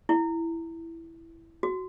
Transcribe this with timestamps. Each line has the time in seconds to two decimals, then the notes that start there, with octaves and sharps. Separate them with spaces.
0.09 E4
1.63 F#4